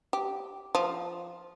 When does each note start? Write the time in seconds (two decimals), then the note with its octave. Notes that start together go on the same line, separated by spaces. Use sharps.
0.13 G4
0.75 F3